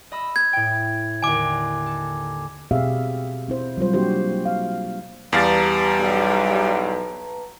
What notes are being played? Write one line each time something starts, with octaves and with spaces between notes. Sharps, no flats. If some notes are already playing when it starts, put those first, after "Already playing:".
D#5 B5 E6
G#6
A2 G5
D#2 A2 D3 G#5 D6
A4
B2 C4 G4 G#4 E5 F5
C4 E4 C5
F#3 G3 F4 C5
A#3 D4 F#4 G4 C5
F5
E2 G3 B4 F5 A5 A#5 A6
B1